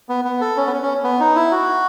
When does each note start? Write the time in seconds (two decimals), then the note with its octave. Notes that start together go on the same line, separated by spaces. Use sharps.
0.09 B3
0.25 B3
0.41 A4
0.57 C#4
0.67 B3
0.72 C#4
0.82 C#4
1.04 B3
1.20 D#4
1.36 E4
1.52 F#4